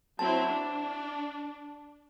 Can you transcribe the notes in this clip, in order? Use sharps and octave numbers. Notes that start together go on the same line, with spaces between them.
F#3 C4 E4 A5
D4